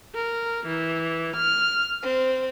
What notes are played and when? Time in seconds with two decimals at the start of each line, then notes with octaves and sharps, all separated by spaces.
0.15 A#4
0.68 E3
1.37 F6
2.01 C4